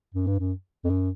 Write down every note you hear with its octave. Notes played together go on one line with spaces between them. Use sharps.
F#2
G2
F#2
F2
F#2